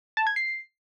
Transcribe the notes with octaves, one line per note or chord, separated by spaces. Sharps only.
A5
G#6
C7